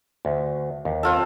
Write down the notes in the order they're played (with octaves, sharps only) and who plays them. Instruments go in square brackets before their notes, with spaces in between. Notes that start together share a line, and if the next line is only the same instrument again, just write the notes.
[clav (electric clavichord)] D2
D#2
[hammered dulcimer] C4 F4 A4